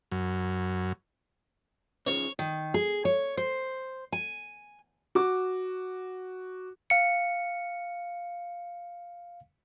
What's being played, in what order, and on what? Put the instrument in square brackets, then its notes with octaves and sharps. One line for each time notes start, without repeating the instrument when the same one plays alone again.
[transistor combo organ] F#2
[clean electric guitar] C#3 F3 [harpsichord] C#5
[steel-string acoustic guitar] D#3
G#4
C#5
C5
G#5
[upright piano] F#4 D6
[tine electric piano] F5 C#7